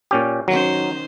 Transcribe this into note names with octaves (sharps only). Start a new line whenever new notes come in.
A#2 C#4 G4
D#3 F#3 C#4 C5